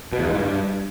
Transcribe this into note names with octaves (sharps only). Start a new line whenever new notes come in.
B2
E2
G2
G#2
G2